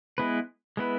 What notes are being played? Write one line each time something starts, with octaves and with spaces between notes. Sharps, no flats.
G#3 B3 E4 B4
G#3 B3 E4 B4